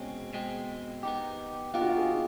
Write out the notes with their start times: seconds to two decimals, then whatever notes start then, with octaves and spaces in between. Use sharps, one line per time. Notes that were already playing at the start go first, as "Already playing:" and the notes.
Already playing: B2 G#3 C4 C#4
0.33 B2 G#3 C4
1.03 B3 D#4 G4
1.74 B3 D#4 F4 G4
1.81 F#4
1.89 F4
1.97 G#4